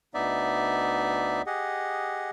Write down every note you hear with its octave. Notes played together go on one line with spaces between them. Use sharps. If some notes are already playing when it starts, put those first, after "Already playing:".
D2 B3 D#4 D5 E5
G4 G#4 D#5 F#5